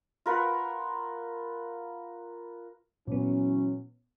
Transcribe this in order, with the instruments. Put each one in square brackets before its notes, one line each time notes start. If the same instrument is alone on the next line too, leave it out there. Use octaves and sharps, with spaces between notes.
[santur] F4 A#4 B4 F#5
[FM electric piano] A#2 B3 [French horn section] E3 F#3 C#4